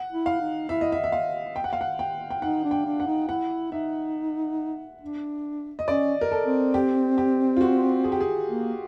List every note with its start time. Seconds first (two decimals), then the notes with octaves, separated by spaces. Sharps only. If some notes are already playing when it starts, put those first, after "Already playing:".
Already playing: F#5
0.11 E4
0.26 F5
0.41 D#4
0.69 E4 E5
0.81 D#5
0.92 E5
1.04 E5
1.12 F5
1.56 G5
1.64 F#5
1.73 F5
1.81 F#5
1.99 G5
2.30 G5
2.42 D#4 F#5
2.64 D4
2.71 G5
2.85 D4
3.00 F#5
3.07 D#4
3.28 E4 F#5
3.72 D#4 E5
5.01 D4
5.79 D#5
5.88 C#4 D5
6.21 A#4
6.31 A4
6.46 C4
6.74 G4
7.18 G4
7.57 F4
7.61 F#4
8.04 G#4
8.12 G4
8.20 G#4
8.47 A#3